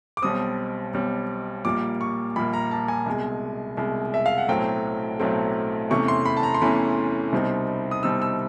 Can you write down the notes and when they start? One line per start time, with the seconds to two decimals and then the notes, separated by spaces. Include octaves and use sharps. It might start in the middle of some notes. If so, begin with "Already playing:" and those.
0.17 D6
0.22 B1 B2 G3 C4 D#6
0.94 B1 B2 G3 C4
1.65 A#1 A#2 G3 A#3 D6
2.01 C#6
2.36 A#1 A#2 G3 A#3 B5
2.54 A#5
2.71 A5
2.88 G#5
3.06 C2 B2 G#3
3.77 C2 B2 G#3
4.14 E5
4.26 F5
4.38 F#5
4.48 B1 A2 F#3 A3 C4 G5
5.20 B1 A2 F#3 A3 C4
5.90 E2 C3 E3 A3 C#4 C#6
6.08 C6
6.26 B5
6.37 A5
6.43 A#5
6.54 C6
6.61 E2 C3 E3 A3 C#4 B5
7.32 C2 B2 G3 C4 D#4
7.91 D#6
8.03 C2 B2 G3 C4 D#4 E6
8.22 E6